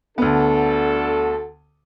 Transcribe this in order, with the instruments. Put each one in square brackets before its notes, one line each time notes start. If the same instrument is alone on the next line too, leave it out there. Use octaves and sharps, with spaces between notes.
[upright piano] D2 B3 [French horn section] D4 F#4 A4